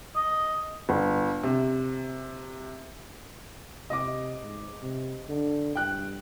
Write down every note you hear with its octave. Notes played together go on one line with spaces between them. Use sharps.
D#5
G1
C3
C3 D#5 D6
G#2
C3
D3
G2 G5 F#6